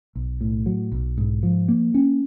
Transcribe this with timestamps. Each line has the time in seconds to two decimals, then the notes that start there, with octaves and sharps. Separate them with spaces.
0.15 B1
0.41 A2
0.66 F#3
0.92 B1
1.18 G#2
1.43 F3
1.68 A#3
1.94 C#4